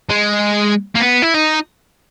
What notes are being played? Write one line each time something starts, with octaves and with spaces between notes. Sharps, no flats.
G#3
A#3
B3
E4
D#4